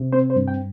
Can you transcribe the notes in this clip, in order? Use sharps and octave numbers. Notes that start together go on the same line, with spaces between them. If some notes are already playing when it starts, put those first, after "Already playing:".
Already playing: C3
C4 C5
C5
G2
G5